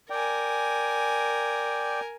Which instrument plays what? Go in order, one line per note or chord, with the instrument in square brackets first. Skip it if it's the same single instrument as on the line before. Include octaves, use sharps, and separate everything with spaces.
[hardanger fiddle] A#4 G#5 [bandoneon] D5 G5